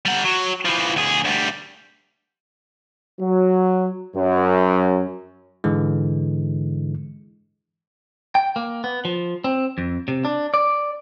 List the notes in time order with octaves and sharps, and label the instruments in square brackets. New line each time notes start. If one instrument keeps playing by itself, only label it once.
[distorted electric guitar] G3 F#5
F#3
E3 F3
D2 G#4
D2 G3
[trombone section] F#3
F#2
[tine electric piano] G#2 D3 E3 G#3
[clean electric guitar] G5
A#3
B3
F3
C4
F2
C3
D4
D5